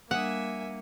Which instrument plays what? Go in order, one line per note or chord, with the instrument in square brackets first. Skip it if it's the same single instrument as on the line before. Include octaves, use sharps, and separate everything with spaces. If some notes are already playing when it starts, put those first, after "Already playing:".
[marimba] G3 D4 D#6 [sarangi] A#3 [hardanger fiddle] E5 G#5 [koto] F#5